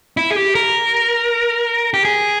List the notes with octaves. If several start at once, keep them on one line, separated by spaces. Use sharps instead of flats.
E4
G#4
G4
A#4
G4
G#4